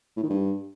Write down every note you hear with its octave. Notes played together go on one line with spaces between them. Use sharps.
A2
D#3
G2